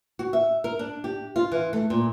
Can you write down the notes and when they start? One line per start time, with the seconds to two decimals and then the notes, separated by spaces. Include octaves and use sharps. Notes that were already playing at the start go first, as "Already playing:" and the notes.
0.19 F#4
0.33 E5
0.64 A#4
0.79 D4
1.04 G4
1.36 F4
1.52 E3
1.73 A3
1.90 A#2